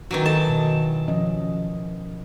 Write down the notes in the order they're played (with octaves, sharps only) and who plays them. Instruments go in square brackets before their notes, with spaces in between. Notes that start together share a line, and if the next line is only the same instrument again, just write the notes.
[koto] D#3 E3 F#3 [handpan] F#4
[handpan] A4 D#5 [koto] A5
[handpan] B2 D#3
F3 C#4 D#5